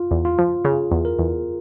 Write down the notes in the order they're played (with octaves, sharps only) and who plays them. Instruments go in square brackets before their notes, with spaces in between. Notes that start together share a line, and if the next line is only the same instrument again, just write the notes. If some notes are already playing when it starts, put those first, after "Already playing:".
Already playing: [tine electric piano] F4
[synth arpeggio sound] E2
[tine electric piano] F4
[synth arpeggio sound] F3
[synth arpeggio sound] C#3 [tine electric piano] G#4
[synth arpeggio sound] E2
[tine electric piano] A#4
[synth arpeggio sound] E2